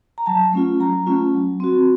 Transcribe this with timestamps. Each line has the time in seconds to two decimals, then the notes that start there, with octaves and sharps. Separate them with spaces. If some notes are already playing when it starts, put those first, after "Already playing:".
0.18 A#5
0.26 F#3 A5
0.53 A3 C#4 F4
0.80 F#3 A#5
1.06 A3 C#4 F4
1.34 F#3
1.60 C4 F#4